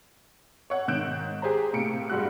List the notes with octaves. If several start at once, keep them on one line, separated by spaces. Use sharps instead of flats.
C#5 F#5
G#2 D#3 F#6 G6 D7 E7
G4 G#4 C5 A#5
A2 C3 A#3 C#7 D7
G2 G3 G#3 F#4 F#6